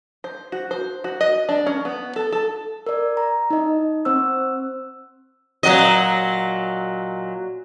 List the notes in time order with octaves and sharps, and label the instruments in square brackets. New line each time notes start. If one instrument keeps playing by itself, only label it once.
[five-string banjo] C5
F#4
C5
F#4
D#5
D4
C#4
B3
A4
A4
[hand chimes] A#4 D5
A#5
D#4 D#5
C4 C5 E6
[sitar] A#2 F#3 D#5